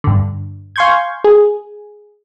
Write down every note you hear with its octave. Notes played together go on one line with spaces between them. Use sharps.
G2 D3
F5 G#5 C6 C#6 G6 G#6
G#4